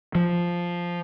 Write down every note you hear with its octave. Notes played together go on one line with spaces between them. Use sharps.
F3